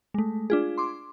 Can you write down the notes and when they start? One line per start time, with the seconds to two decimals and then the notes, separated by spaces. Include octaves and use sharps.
0.14 G#3 A3
0.50 D4 F4 G#4
0.78 C6 D6